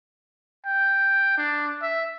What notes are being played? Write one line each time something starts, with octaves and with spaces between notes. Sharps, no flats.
G5
D4
E5